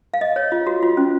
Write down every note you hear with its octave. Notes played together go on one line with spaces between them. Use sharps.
F5
D#5
C#5
F4
F#4
F4
C#4